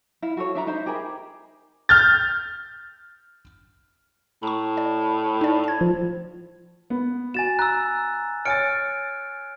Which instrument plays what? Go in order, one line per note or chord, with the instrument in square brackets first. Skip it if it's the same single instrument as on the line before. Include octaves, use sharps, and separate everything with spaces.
[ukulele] E4 F5
F#4 A4 C#5
D4 E5 A#5 B5
D#4 C5 E5 A#5
G4 G#4 A#4 B5
[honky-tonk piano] F6 G6 A6
[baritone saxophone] A2 [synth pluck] A#5 C#6
[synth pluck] D5
D#4 D5
A5 G#6
[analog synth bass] F3
[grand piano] B3
[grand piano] F#4 [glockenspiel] G#5 A6 E7
[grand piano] A#5 [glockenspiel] E6 F#6
[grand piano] C#5 G#5 A6 [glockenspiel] F6 C#7 D7